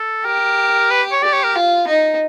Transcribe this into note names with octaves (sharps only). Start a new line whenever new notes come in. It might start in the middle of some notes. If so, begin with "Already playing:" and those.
Already playing: A4
G4 A#4
B4
C#5
G4 D5
C#5
A#4
F4
D#4